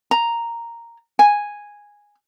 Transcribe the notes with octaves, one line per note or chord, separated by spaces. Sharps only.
A#5
G#5